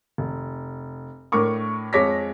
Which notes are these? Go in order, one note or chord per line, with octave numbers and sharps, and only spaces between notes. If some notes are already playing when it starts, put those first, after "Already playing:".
F1
A2 D4 A#4 C#6 D6
F2 G#3 C#5 D6 A#6 B6